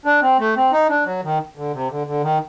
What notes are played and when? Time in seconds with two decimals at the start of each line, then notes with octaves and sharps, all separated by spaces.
0.05 D4
0.22 C4
0.39 A3
0.56 C4
0.72 D#4
0.89 D4
1.06 F#3
1.23 D#3
1.57 D3
1.73 C3
1.91 D3
2.07 D3
2.23 D#3